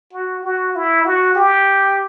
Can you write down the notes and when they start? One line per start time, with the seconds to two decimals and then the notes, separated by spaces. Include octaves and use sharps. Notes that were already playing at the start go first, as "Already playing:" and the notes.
0.13 F#4
0.44 F#4
0.75 E4
1.06 F#4
1.35 G4